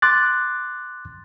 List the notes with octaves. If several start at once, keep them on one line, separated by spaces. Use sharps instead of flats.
C6 D6 F#6 A6